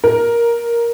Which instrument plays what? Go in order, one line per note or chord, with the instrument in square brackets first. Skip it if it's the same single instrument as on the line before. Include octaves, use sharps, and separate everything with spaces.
[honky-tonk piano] A#4